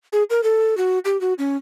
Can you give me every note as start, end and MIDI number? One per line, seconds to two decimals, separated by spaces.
0.13 0.23 68
0.30 0.43 70
0.43 0.77 69
0.77 0.99 66
1.05 1.19 67
1.21 1.33 66
1.39 1.57 61